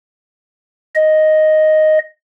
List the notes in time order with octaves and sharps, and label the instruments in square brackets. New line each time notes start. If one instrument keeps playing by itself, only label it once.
[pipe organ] D#5